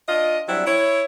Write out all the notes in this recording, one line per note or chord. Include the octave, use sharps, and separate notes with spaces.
D4 F4 D#5
F#3 G3 C4 D4 E4
E4 C#5